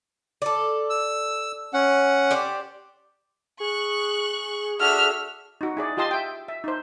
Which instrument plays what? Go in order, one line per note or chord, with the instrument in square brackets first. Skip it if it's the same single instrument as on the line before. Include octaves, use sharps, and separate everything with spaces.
[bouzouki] A4 D5
[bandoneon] E6
C#4 F#5
[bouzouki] G4 C5 D5
[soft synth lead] G#4 [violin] C#6 F#6
[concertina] D4 F#4 A4 [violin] E5 [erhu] F6
[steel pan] D#4 F#4
E4 G#4 D5
F4 G4 D#5 A5 C6
E5 G5
E5
D#4 C5